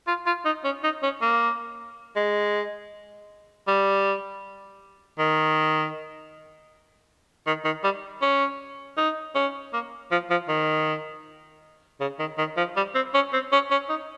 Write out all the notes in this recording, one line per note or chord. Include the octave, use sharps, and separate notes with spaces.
F4
F4
D#4
C#4
D#4
C#4
A#3
G#3
G3
D#3
D#3
D#3
G3
C#4
D#4
C#4
A#3
F3
F3
D#3
C#3
D#3
D#3
F3
G3
C4
C#4
C4
C#4
C#4
D#4